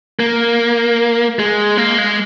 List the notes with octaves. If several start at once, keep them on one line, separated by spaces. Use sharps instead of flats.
A#3
G#3
A#3
G#3